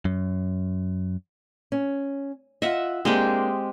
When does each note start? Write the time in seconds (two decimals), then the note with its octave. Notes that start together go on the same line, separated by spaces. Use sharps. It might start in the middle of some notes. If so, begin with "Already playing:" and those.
0.05 F#2
1.72 C#4
2.62 F4 D#5 E5 F#5
3.05 G#3 A#3 C4 D4 G4